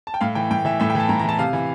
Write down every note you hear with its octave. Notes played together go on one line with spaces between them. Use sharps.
A5
G5
A2 F5
E3 G5
A2 G5
E3 E5
A2 E5
G5
E3 A5
A2 A#5
A#5
E3 A5
C3 F5
E3